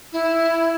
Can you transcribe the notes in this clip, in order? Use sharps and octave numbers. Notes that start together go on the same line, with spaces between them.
E4